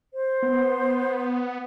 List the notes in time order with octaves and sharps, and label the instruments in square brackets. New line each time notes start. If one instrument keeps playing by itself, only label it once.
[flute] C5
[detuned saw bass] B3